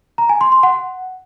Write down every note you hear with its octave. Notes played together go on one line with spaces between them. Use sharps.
A#5
G#5
C6
C6
F#5